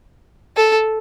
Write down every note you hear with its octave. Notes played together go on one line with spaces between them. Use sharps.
A4